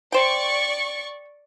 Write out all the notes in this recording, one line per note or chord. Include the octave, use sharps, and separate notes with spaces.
C5 D5 G5 C#6